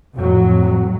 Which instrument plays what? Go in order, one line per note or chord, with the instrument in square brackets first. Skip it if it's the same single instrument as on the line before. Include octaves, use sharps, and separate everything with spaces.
[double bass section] F2 A2 F#3